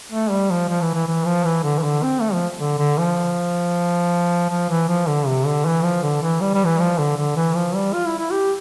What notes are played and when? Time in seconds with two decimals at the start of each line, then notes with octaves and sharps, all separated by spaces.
0.12 A3
0.31 G3
0.50 F3
0.69 F3
0.82 E3
0.94 E3
1.07 E3
1.26 F3
1.45 E3
1.64 D3
1.79 E3
1.83 D3
2.03 C4
2.21 A3
2.34 F3
2.60 D3
2.78 D3
2.98 F3
4.50 F3
4.70 E3
4.88 F3
5.07 D3
5.26 C3
5.46 D3
5.65 E3
5.83 F3
6.03 D3
6.22 E3
6.41 G3
6.54 G3
6.66 E3
6.79 F3
6.98 D3
7.17 D3
7.36 E3
7.55 F3
7.75 G3
7.93 F4
8.06 E4
8.19 E4
8.31 G4